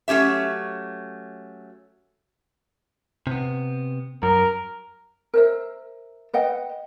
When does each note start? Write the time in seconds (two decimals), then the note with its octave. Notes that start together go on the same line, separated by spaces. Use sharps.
0.08 F#3 A3 C#4 G4 E5
3.27 C3 B3
4.23 F#2 A#4
5.34 A#4 C5 E5
6.33 B4 D#5 F#5 G5